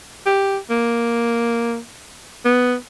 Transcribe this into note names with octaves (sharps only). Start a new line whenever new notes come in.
G4
A#3
B3